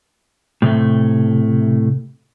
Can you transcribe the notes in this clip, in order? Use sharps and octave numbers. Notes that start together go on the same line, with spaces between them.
A2 C3 A3